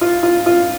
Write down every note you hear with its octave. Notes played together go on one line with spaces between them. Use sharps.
F4
F4
F4